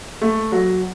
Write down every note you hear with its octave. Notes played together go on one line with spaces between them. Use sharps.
A3
F#3